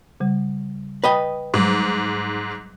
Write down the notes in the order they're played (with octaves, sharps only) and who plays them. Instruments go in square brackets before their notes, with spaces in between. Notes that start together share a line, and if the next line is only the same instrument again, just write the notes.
[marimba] C#3 G3
[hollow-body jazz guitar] B4 D#5 G5 [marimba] B5 D#6
[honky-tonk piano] G#2 [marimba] F#3 G3